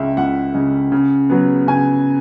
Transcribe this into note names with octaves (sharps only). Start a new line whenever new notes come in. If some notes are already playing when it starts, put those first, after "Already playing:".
Already playing: C#2 C#3 G#3 E5
C#2 F#5
C#3 G#3
C#3
F#3 B3
C#3 G#5